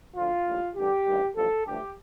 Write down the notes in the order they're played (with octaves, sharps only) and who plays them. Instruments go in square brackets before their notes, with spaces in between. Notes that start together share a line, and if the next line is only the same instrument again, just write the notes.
[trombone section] D2 D3 F3 F4
A#1 A2 G3
A1 G2 D3 G3 G4
A1 G2 D#3 G3
A1 G2 F3 A4
A1 G2 D3 F3 A3 G4